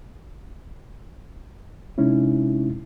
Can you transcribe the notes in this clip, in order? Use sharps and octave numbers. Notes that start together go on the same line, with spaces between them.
C3 G#3 C#4 D#4 E4